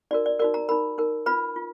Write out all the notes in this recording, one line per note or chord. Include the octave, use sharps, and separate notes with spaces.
D#4 F#4 A#4 D5
D5
D#4 F#4 A#4 D5
A#5
D#4 A#4 B5
D#4 A#4
F4 B4 B5
F4